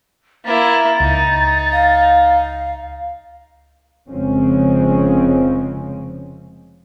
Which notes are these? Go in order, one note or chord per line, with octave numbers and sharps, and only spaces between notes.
A#3 E4 A6
C#2 D#4
F5
F1 C#3 F3 G#3 C4 C#4